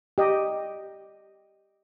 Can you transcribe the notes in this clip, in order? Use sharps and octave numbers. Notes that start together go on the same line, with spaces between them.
G4 D#5